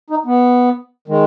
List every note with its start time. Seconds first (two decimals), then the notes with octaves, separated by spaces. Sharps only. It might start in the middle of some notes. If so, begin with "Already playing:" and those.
0.10 D#4
0.26 B3
1.08 D#3 G#3